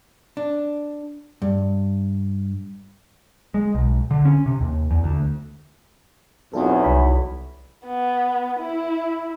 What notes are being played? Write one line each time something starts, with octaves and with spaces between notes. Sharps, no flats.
D4
G2
G#3
B1
D3
C#4
C3
D#2
E2
D2
B1 E2 C4 F4 A4
C2 B5
B3
E4